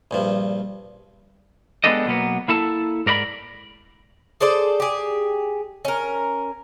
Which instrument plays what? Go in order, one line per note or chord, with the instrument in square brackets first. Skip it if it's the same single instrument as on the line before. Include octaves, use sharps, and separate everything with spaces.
[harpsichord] A#1 G2 F3
[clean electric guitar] G#3 B3 D4 G4 A4 D#5
B1 F#3 A#3 B3
A#3 E4 A4 A5
G#2 A#4 D5 F#5 B5
[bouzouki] G#4 A4 C5 D5
G4 G#4
C#4 A#4